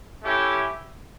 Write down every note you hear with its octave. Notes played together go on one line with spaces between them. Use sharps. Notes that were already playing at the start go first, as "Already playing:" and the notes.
A3 C#4 E4 G4